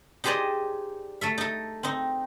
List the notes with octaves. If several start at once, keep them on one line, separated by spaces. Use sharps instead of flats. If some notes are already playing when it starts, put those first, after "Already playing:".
D#4 G4 G#4 C5 D5 D#5
A3 A4 E5
D#4 A4
C4 D#4